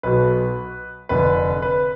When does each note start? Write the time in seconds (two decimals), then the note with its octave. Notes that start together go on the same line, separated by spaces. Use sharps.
0.03 B1 B2 B4
1.09 F1 F2 D3 B4
1.62 B4